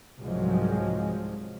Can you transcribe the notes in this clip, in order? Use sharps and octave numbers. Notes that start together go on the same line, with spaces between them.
C2 G#2 F3 F#3 G#3